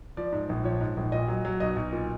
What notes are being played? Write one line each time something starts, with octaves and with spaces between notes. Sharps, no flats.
F3 D5
G#2
A#1
F3 C#5
G#2
A#1
A#2 D#5
F#3
F#3
B1 D#5
B1
A#2